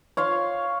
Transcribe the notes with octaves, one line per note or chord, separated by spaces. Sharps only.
C#5 F5 C6